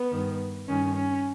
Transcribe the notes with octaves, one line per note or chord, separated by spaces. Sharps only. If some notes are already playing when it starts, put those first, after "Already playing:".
Already playing: B3
G2 D#3
G2 D#3 C#4
C#4